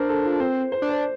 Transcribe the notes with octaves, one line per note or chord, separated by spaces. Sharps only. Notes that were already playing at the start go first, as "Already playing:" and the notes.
Already playing: D4 A#4 C5
A4
F4
C4 C5
C5
D4
C5